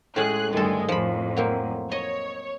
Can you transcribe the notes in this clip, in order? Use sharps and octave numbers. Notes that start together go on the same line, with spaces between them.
A2 G#3 C#4 G#4 F#6
D2 G2 D#3 G#3 A4
F2 A2 F3 B5
F#3 A#3 C4
C#5 D#5